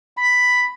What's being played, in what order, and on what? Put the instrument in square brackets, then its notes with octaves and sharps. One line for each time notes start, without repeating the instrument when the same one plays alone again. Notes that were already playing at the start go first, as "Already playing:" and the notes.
[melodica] B5